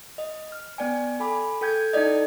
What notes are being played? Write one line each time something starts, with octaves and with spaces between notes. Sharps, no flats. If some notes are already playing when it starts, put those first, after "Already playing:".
D#5
F6
B3 D5 G5 G#5
A4 G#5 B5 D6
A4 G5 G6 G#6
D#4 E4 A4 D5 D#5